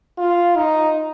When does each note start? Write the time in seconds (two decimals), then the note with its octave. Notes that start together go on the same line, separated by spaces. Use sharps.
0.18 F4
0.56 D#4